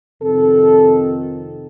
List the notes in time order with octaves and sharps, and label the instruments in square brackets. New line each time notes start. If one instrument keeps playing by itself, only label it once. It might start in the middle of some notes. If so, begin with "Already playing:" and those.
[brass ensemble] F2 C3 D#3 A4